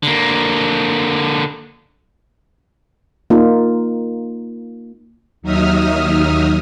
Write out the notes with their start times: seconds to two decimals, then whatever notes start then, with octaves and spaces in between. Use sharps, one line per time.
0.03 D3 A#3
3.30 A#3 D#4 F4
5.42 D#2 F#3 D#4 E5 D#6 F6